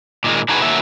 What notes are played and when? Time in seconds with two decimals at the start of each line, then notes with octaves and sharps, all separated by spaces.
0.24 A#2 D#3 G#3
0.49 D4 D#4 F#4 G#4 A4 B4
0.62 D#3 A3 A#3 C#4 F#4 E5